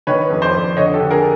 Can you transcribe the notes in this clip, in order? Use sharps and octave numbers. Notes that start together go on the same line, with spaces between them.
D#3 B4 C#5
F2
C5 D5
F2
D3 C#5 D#5
G4 A4
D3
G#4 A#4